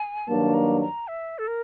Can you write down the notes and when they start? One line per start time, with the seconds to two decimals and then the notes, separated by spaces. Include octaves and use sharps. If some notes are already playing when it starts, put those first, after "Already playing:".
Already playing: G#5
0.27 G2 D#3 F#3 A#3 D4 A5
0.54 A#5
0.81 A#5
1.08 E5
1.38 A4
1.47 A#4